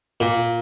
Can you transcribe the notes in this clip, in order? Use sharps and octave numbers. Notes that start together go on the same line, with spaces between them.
A#2